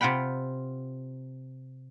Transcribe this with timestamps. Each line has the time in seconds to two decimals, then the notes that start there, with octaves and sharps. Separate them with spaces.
0.01 C3 F4 F#5 G5 B5